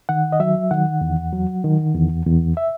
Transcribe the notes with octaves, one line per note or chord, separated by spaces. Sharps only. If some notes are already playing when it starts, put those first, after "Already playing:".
D#3 F#5
D#5
F#3 E5
D#3 F#5
E2
F#3
D#3
E2
E2
E5